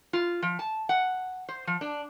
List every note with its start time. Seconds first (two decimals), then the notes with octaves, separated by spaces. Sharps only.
0.13 F4
0.42 F3
0.59 A5
0.89 F#5
1.49 C5
1.67 F3
1.81 D4